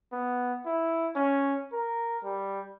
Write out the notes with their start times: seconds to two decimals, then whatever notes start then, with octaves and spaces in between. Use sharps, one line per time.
0.13 B3
0.65 E4
1.16 C#4
1.73 A#4
2.24 G3